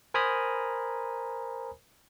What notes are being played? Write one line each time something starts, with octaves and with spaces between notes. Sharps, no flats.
A#4 C5 G#5 A#5 B5 D#6